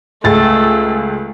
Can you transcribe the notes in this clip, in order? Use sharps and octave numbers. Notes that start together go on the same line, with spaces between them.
C#2 A3 G#4 A6